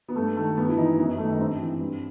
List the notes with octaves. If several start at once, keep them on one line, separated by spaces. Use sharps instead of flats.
B3
G2 A3
D#3 A3
G2 B3
E4
E3 D#4
F#2 B3
D#3 A3
D#4
G2 C4
E3
G2